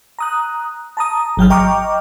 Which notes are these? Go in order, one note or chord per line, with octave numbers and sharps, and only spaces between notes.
A#5 D#6 F#6
A5 A#5 D#6
G#1 F#3 G5 F6
D#5 G5 A#5 C#6 D6 F6